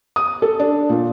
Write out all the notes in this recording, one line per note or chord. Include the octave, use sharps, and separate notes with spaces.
D#6
A4
D4
A#2